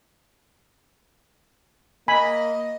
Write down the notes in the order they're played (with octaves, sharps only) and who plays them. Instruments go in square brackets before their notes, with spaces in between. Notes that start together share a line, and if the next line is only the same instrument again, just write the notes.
[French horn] A#3 [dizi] D#5 [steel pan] G#5 B5